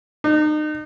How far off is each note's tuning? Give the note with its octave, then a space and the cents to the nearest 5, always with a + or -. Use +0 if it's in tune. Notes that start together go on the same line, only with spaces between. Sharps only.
D#4 -35